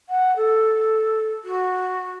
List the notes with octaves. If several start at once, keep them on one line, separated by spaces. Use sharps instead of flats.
F#5
A4
F#4